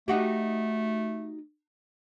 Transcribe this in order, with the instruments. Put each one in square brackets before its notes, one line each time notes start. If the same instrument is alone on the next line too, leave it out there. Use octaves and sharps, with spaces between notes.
[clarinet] A3 [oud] D#4 F#4 G4